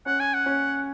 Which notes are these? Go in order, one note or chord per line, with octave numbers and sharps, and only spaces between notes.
C#4 F#5
G#5
F#5
C#4